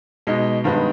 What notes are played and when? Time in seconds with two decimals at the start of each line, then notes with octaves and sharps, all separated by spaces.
0.27 B2 G#3 D#4
0.64 G2 D#3 G#3 B3